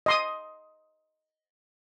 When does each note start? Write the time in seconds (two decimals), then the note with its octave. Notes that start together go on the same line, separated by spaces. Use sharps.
0.06 D#5 C6 D#6